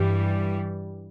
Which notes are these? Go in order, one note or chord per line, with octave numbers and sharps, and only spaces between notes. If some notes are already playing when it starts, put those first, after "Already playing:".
Already playing: G2 E3 G3